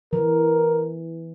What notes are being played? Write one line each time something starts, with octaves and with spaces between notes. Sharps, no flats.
E3 A#4